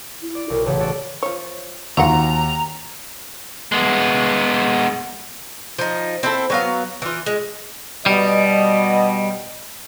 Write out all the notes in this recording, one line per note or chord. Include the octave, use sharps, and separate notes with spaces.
E4
D5
B1 A#4
A1 C#3 A3 C#5
F#4 A4 D5
F3 C#5
D#2 F#3 F4 F#5 A#5
G#3 B3
F3 D#4
C4 E4 A4
F#3 B3 F5
E3 F4
G#3
B2 G3 D#5